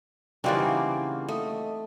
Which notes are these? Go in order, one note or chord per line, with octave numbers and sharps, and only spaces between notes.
C#3 E3 G3 A#3 C4 D#4 F#4 D5
A3 D#5